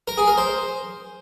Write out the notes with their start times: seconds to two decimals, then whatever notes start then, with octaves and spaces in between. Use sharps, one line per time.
0.08 A#4
0.18 G#4
0.28 A#4
0.38 C5